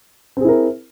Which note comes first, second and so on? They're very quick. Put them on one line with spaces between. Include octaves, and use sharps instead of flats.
C4 G#4 E4 A#4